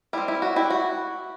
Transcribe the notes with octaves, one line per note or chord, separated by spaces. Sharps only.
G3 C4 E4
E4
F#4
E4 G4
F#4